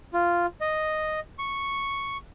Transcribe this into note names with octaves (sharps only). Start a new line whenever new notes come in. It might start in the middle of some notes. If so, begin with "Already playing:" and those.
F4
D#5
C#6